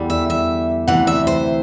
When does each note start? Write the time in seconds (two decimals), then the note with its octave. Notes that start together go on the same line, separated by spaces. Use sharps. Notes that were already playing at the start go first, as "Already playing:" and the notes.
Already playing: E2 D3 G3
0.10 E5
0.30 E5
0.88 D2 C3 E3 F#5
1.07 E5
1.27 C5